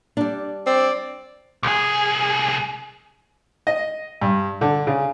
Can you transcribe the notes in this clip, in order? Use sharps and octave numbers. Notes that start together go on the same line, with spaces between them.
G3 D4
C4 D5
C2 G#4
D#5
G2
D3
C#3